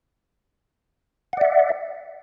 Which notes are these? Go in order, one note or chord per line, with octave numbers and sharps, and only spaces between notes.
D5 E5 F#5